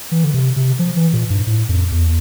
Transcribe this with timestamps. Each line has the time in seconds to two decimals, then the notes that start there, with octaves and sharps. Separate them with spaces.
0.12 E3
0.24 D3
0.34 C3
0.56 C3
0.79 F3
0.96 E3
1.13 A#2
1.30 G2
1.47 A2
1.69 F2
1.91 E2